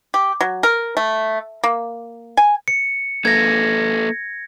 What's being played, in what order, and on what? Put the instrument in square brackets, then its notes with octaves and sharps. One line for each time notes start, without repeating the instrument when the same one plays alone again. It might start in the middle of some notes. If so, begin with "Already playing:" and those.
[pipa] G4
F#3
A#4
A3
A#3
G#5
[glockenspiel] C#7
[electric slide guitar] A#3 A4 B4 [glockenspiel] G#6 A#6